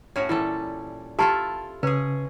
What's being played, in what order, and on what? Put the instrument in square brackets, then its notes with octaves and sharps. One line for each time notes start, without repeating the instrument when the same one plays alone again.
[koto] A2 C#4 F#4 [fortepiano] C#5
[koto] A#2 G3 A4 [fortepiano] E3
[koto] E4 F4 A4 [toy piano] G4 A5 B5
[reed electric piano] C#3 [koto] C#4 G#4 [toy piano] B4